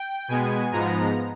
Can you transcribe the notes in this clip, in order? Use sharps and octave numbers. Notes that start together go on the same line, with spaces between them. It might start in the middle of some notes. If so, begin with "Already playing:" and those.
Already playing: G5
B2 G#3 B3 G#5
G#2 F3 G#3 B3 A#5